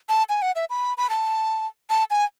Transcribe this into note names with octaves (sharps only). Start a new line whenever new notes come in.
A5
G#5
F#5
E5
B5
B5
A5
A5
G#5